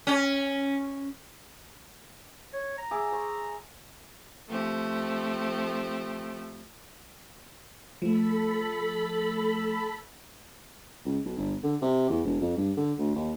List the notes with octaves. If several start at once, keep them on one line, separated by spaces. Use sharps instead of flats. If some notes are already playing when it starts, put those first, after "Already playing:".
C#4
C#5
A#5
G#4 E5 D6
C5 C#6
F3 A3 C4 G4
F3 A3 A4 B5
C#2
B1
G1
D3
C3
E2
E1
F2
G2
D3
D2
D#2